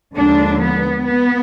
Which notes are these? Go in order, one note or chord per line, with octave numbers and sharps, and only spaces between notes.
D#2 D3 F3 G#3 D4
B3
B3